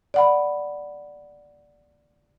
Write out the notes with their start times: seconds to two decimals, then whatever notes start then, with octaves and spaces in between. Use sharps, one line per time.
0.14 D5 F#5 B5